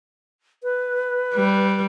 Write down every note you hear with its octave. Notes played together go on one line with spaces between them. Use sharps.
B4
G3